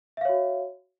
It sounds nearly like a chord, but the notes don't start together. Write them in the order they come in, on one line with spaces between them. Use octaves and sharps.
E5 F5 C#5 F#4